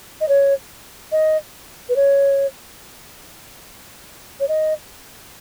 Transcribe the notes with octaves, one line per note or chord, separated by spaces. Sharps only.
D#5
C#5
D#5
B4
C#5
C#5
D#5